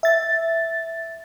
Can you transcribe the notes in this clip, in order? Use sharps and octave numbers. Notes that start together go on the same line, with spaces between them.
E5 A6